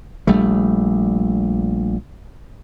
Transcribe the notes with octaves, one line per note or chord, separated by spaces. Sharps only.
A#1 G3 A3